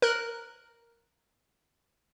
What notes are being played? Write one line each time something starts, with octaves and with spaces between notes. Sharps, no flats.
A#4 F#6